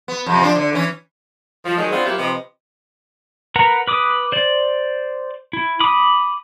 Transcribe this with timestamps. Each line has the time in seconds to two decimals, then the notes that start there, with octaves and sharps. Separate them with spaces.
0.08 B3
0.26 F2 C3
0.41 F3 D4
0.55 D3
0.73 E3 C#4
1.65 F3
1.78 D#3 F#3 G#3
1.92 B3 C4 D4 F4
2.06 F#3 A#3 E4 F4 G4
2.19 C3 F3 B4 D#5
3.56 A#4 B4 F#5 A#5
3.87 B4 D6 D#6
4.32 C5 D5
5.53 E4
5.80 B5 D6 D#6